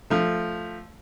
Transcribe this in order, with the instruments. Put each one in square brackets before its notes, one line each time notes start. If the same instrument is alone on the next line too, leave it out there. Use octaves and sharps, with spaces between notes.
[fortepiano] F3 A3